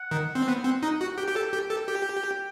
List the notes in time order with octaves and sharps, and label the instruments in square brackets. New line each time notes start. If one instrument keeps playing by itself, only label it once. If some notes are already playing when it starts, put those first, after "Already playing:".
Already playing: [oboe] F#5
[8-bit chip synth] D#3
C4
[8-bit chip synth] B3 [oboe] F#5
[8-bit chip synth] C4
D#4
F#4
[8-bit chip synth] G4 [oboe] G5
[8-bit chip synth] G4
A4
G4
A4
G4